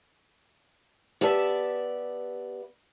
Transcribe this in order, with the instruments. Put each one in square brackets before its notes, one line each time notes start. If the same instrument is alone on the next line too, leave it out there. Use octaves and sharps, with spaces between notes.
[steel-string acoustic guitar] B3 G4 D5 E5 A5